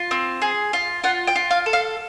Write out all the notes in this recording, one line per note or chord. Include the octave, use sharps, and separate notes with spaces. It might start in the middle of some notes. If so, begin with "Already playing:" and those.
Already playing: F4
C4
G#4
F4
F4 F#5
G5
F4
F5
A4
F5